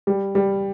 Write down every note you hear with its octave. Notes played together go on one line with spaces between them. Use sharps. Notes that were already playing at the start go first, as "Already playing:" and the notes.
G3
G3